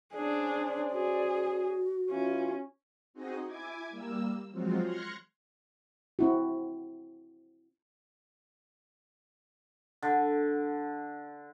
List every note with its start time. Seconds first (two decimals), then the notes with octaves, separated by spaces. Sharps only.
0.14 C#4 D4 G#4 C5 D5
0.93 F#4 G#4
2.11 E3 C#4 E4 F4
3.14 C4 D#4 F#4 G#4 D#5
3.46 E4 G#5 D6 G#6
3.90 G3 A#3 E6
4.52 F3 F#3 G#3 C4 F4 F#4
4.81 C6 F6 F#6 G#6 A#6 C#7
6.19 C4 E4 F#4
10.02 D3